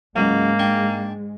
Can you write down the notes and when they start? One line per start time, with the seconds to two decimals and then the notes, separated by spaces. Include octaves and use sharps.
0.16 C#2 G#2 F#3 G#3 A#3
0.59 D4 G5 C#6